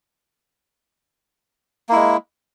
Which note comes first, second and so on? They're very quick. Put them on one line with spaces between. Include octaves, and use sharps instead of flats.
A#3 E4 G#3